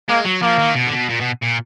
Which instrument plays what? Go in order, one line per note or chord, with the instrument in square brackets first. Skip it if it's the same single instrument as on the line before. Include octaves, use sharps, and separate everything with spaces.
[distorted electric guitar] G#3 [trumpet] A#3
[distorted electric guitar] F#3
[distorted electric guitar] F3 [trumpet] A#3
[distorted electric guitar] D#3
B2
D3
B2
A#2
B2
A#2